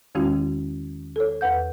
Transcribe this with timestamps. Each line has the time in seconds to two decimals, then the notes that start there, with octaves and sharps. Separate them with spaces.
0.15 E2 D#3 G#3 C#4 E4 F#4
1.16 A4 C#5
1.41 E2 B4 F#5 G6